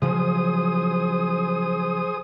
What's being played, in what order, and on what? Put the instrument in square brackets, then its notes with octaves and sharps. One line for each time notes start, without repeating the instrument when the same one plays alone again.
[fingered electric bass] C#3 F3 F#3 [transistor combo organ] G#4 C5 D#6